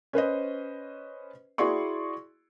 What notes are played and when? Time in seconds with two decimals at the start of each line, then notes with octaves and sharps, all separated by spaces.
0.13 C#4 B4 C5 D#5
1.58 E4 F#4 G#4 D5 C6 C#6